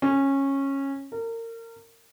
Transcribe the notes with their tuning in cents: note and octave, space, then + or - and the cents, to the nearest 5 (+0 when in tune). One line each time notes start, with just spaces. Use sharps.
C#4 -15
A#4 -30